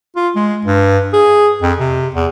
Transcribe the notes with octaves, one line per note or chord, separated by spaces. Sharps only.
F4
G#3
G2
G#4
F2
C3
E2